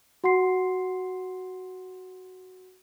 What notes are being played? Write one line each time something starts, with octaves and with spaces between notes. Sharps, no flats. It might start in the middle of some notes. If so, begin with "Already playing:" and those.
F#4 F#5 C6 C7